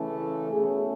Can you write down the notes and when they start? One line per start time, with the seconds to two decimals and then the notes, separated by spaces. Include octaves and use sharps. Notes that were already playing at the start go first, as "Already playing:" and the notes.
Already playing: C#3 E3 A3 C#4 A4
0.52 B2 A3 C#4 G#4